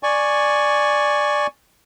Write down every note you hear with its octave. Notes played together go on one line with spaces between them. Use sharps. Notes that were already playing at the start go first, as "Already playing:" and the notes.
D5 G#5 C#6